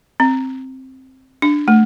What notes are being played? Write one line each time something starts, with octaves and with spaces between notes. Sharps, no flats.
C4
D4
A3